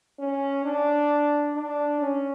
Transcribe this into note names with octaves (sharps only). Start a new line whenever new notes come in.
C#4
D4
D4
C#4